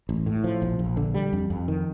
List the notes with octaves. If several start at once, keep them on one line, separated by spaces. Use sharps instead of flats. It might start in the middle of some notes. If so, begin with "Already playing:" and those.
A1
A2
F3
A#1
A#1
D3
G3
F2
F2
D#3